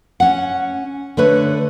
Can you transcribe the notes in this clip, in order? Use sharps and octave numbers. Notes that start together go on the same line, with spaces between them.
C#4 F#5
D3 A3 B4 C#5